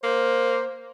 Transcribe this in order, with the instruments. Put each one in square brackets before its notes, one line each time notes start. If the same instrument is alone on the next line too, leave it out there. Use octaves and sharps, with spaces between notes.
[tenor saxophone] A#3 [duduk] C5